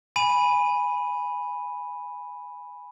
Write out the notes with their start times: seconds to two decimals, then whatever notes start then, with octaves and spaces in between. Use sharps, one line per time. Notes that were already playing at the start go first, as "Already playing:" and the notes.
0.16 G#5 B5 D#7